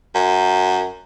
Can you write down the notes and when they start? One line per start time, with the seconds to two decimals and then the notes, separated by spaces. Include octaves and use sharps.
0.15 F#2